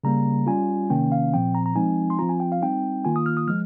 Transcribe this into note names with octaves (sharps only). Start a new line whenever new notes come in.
C#3 G3 A#3 A#5
G3 C#4 F4 G#5
C3 D#3 A#3 C#4 G5
F5
A#2 F3 C4 G5
A#5
A#5
F3 G#3 C4 D#4 G#5
C6
F3 C4 F4 A#5
G#5
G5
F5
G3 C4 D#4 G5
D#3 A#3 F4 G#5
D#6
F6
D#6
F3 G#3 F6